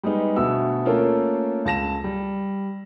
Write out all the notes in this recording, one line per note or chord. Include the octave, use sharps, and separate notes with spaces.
G3 G#3 B3 D#4
D2 B2 F#4 E5 E6
A3 A#3 C#4 F4 A4 A#4
C#2 A5 A#6 E7
G3